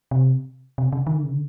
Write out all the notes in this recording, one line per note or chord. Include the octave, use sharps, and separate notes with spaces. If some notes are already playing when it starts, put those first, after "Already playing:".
C3
C3
C#3
D#3
D3
C#3
D3